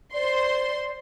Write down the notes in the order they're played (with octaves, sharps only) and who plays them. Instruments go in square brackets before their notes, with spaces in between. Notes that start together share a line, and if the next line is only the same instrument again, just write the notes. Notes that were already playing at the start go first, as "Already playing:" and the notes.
[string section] C5 C6 [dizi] D5